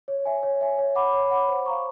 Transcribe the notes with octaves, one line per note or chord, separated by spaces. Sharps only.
C#5
E5 G#5
C#5
E5 G#5
C#5
F#5 B5 D6
C#5
F#5 B5 D6
C5
F5 A#5 C#6